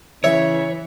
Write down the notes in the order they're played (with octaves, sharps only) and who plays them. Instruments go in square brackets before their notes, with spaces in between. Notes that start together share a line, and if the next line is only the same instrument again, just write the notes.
[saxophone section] C#3 E4 [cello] E3 [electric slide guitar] C#5 [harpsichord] E5